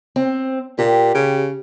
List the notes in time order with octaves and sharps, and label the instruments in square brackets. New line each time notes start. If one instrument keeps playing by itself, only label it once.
[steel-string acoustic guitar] C4
[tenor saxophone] A#2 [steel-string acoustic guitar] G4
[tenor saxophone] C#3